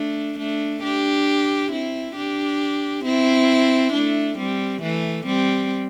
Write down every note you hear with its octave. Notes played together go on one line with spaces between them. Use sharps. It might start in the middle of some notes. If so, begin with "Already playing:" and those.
Already playing: A3 D4
A3 D4
D4 G4
C4 E4
D4 G4
C4 E4
A3 D4
G3 C4
E3 A3
G3 C4